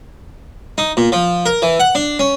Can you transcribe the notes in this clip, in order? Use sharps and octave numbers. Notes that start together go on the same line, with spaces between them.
D#4
A#2
F3
A#4
E3
F#5
D4
C#4